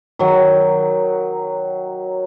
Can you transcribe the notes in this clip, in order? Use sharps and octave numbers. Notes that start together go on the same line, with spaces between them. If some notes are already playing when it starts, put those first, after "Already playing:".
D#3 F#3